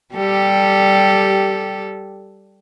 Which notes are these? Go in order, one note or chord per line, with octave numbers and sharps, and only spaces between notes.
G3 G4 A4